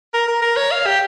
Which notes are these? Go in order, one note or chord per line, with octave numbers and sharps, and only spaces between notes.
A#4
A#4
A#4
C#5
F5
G4